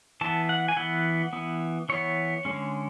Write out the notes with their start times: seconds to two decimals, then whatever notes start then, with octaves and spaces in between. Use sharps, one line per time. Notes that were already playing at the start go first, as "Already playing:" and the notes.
0.21 E3 B3 A5
0.49 F#5
0.68 G#5
0.77 E3 B3 F#5
1.33 E3 B3
1.89 E3 B3 C#5
2.45 D3 G#3 C#4